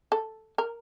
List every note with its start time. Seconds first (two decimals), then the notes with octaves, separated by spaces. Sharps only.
0.12 A4
0.58 A#4